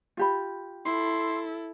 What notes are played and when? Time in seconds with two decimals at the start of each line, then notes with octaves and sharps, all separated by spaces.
0.17 F4 G4 B5
0.86 E4 A4 C6